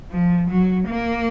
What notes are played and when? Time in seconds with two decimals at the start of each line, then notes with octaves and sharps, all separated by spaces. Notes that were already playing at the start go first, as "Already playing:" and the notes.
0.12 F3
0.50 F#3
0.88 A#3